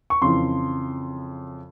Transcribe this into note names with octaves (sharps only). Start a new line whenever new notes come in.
C#6
F2 C#3 E3 C6